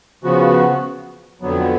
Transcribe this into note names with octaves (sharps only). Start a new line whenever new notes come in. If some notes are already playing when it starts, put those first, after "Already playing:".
C#3 F3 B3 F#4
F2 D3 F#3 B3